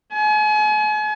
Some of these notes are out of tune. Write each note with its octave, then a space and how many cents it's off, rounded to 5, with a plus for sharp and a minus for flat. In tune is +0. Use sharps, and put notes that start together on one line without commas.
G#5 +40